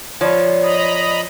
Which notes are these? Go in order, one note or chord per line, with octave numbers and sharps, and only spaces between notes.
F3 C#5 D5 B5
D#5 A#5 B5 D#6